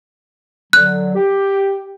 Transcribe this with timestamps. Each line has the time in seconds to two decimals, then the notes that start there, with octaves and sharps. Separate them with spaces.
0.73 D3 F#3 F#6
1.15 G4